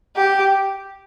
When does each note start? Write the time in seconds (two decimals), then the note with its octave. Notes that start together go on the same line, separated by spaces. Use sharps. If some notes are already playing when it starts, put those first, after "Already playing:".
0.16 G4